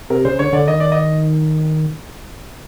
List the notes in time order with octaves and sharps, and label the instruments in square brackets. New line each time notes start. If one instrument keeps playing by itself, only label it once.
[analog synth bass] C3 [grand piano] A#4
[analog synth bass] C#3 [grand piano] C5
[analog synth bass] D3 [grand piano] C#5
[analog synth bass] D3 [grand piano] D5
[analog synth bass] D#3 [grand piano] D#5
[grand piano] D5
D#5